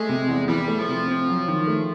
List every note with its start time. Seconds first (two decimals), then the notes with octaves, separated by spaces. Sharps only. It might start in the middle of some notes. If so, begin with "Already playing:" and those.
Already playing: G#3 A3
0.09 C3
0.28 E2
0.48 E3 G3
0.68 A3
0.79 F3
0.88 C3
1.08 C4
1.28 F#3
1.48 D#3
1.67 A3